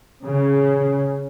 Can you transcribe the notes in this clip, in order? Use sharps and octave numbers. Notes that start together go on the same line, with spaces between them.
C#3